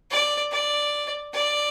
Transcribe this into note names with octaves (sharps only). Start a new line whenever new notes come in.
D5
D5
D5